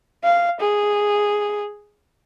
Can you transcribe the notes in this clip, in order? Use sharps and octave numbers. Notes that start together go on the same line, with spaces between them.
F5
G#4